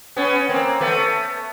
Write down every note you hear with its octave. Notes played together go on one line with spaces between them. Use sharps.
B3 C#4
A#3 C4
A3 B3